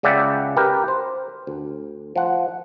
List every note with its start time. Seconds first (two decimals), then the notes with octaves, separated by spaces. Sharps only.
0.03 C#2 C#3 D5 E5 F#5 G5
0.57 G4 A#4 B4
0.88 C5
1.47 D2
2.16 F3 F#5